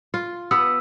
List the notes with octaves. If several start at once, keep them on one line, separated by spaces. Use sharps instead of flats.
F4
B3 B4 E6